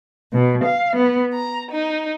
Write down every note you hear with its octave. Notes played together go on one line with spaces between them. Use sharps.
B2
F5
B3
A#5
D#4